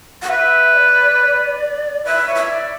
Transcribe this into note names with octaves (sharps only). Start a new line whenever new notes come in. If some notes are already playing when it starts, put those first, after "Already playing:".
F#5
B4 E5
D5
B4 E5
C#5
E5
D5